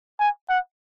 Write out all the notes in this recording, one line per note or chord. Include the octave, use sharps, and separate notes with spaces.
G#5
F#5